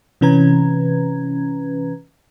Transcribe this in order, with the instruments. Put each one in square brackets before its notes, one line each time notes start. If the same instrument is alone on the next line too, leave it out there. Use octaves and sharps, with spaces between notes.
[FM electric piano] C3 E3 C#4 B4 A#5 G#6